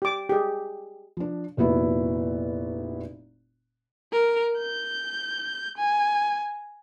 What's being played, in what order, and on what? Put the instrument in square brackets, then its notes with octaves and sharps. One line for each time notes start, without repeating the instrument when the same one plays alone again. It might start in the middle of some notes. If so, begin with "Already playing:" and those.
[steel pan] G4 D6
G4 G#4
[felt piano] F3 D4
F1 A#2 B3 E4 F#4
[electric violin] A#4
G6
G#5